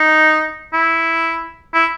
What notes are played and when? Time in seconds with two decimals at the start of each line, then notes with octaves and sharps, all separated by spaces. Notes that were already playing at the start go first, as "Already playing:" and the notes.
Already playing: D#4
0.73 E4
1.74 E4